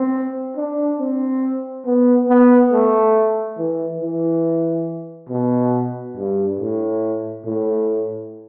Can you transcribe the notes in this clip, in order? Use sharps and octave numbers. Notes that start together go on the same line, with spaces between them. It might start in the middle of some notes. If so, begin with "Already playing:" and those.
Already playing: C4
D4
C4
B3
B3
A3
E3
E3
B2
G2
A2
A2